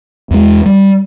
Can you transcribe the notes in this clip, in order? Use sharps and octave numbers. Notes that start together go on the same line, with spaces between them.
E2 G#3
G3